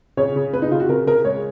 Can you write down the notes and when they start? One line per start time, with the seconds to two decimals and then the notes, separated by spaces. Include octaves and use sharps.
0.17 C#3 C#5
0.36 C#3
0.53 C#3 B4
0.62 D#4
0.71 C#3 F4
0.80 F#4
0.89 C#3 A#4
1.07 C#3 A#4
1.24 G#3 C#5